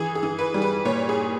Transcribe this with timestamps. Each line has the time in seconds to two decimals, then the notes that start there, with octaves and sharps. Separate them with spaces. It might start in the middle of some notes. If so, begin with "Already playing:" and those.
Already playing: E3 G#4
0.15 G#4
0.23 E3
0.39 B4
0.54 G3
0.62 B4
0.85 A#2 C#5
1.09 G#4